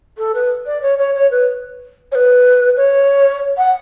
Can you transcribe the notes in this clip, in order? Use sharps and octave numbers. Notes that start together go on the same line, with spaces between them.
A4
B4
D5
C#5
C#5
C#5
B4
C#5
B4
C#5
F#5